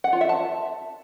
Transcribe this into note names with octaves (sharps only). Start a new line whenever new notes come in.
F#5
F4
E5
A5